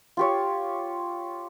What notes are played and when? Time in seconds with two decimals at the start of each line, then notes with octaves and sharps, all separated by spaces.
0.17 F4 G4 C#5